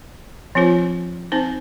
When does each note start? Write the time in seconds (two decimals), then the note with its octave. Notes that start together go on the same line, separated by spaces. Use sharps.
0.55 F3 C4 F4 C5
1.32 C4 D#4 C5